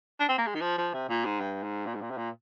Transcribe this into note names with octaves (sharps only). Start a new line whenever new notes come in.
D4
C4
A#3
G#3
D#3
F3
F3
C3
A#2
G#2
G2
G#2
A#2
G#2
A#2
C3
A#2